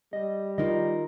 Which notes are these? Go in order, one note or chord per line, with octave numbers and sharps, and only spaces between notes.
G3 D#5
D#3 D#4 F4 A#4 D#5